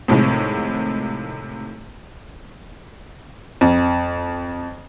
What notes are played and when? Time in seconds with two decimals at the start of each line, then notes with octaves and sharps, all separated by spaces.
0.08 A2 C3 D#3 F3 G#3
3.61 F2